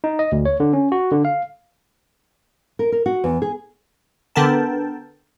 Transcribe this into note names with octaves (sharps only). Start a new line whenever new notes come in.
D#4
D#5
D2
C#5
D3
C#4
F#4
D3
F5
A#4
A#4
F#4
E2
G#4
D3 B3 A4 A#4 G5 A5